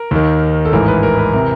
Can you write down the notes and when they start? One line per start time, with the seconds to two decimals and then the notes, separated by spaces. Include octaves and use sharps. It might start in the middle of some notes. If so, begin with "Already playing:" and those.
Already playing: A#4
0.11 D#2 D#3
0.65 A4
0.72 A1 G#2 E3 A#4
0.88 B4
1.03 A#4
1.18 B4
1.33 C3 E3 A#4